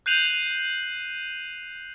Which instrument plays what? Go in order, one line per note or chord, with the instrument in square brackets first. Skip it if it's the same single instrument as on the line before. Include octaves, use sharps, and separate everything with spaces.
[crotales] F#6 G6 C7 D#7 F7 F#7